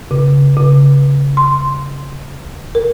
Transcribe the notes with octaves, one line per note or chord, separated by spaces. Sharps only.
C#3
C#3
C6
A#4